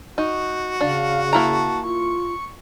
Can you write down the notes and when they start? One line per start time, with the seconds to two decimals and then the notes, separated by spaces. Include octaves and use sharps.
0.18 D#4 F#4
0.81 C#3 D4 F5
1.33 A#3 E4 A5 A#5
1.84 F4 C#6